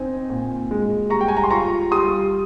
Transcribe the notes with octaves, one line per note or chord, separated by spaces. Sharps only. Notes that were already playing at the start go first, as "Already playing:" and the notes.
Already playing: C4 D#4 G#5
A#2
G#3
G3 A#5 C#6
G5
G#5
A#5
C6
F4 A#5 C#6
G3 C6 D#6